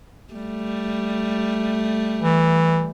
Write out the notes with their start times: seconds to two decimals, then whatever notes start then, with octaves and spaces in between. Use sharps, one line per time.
0.33 G3 A3
2.23 E3